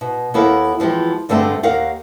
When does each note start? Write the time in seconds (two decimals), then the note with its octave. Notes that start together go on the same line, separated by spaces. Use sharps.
0.01 B2
0.34 D#2 B3 E4 A4 A#4 F5
0.79 E2 E3 F3 G#3 G4
1.29 G2 D3 G#3 A3 C4 A5
1.63 D#2 D#3 A#4 F5 F#5